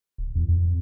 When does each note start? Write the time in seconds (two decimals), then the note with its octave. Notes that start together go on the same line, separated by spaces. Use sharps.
0.18 D1
0.35 E2
0.48 F2